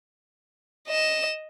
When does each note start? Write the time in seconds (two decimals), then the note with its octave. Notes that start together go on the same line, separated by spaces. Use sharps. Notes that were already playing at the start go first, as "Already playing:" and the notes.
0.88 D#5 E7